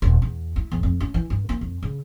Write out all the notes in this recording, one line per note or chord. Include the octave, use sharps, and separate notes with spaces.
D#1
E2
E4
E2
F2
C#4
E3
G2
A#3
F2
C#3